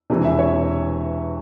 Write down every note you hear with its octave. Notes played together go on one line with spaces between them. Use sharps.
E1 E2 C3 E3
E5
C#5